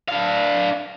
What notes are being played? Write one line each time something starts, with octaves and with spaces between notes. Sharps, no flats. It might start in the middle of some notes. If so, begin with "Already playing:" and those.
D4 F5